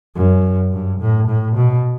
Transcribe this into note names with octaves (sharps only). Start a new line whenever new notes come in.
F#2
G2
A2
A2
B2